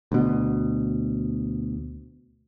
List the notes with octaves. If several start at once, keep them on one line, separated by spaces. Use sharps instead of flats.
D2 B2